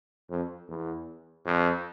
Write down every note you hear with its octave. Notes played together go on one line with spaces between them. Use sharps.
F2
E2
F2